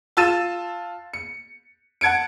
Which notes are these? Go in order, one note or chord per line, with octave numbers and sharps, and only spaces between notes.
F4 A5 E6 A6 D#7 E7
C#7
F#5 A5 G#6 C#7 D7